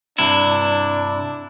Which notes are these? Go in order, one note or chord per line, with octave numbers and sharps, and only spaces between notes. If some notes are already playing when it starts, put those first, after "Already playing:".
G2 C3 D4 E4